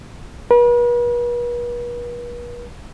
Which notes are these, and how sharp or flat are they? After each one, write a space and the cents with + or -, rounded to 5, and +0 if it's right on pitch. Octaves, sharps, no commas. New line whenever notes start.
B4 -45